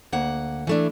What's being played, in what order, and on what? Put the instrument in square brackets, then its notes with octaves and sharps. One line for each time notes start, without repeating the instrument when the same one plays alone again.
[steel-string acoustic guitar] D2 A#3 F#5
E3 A3 D4